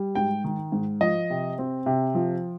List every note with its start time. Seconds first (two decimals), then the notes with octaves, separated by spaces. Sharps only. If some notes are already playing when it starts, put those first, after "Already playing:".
Already playing: G3
0.15 G#2 G5
0.44 D#3
0.72 G#2
1.01 F3 D#5
1.30 C3
1.59 C4
1.86 C3
2.15 F3